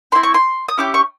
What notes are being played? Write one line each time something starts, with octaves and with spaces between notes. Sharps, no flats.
C4 E4 G4 C6
C#6
C6
D#6
C#4 E4 G4 D6
C#6